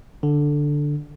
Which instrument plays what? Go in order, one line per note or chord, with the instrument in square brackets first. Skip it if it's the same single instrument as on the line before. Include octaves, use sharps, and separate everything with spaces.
[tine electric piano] D3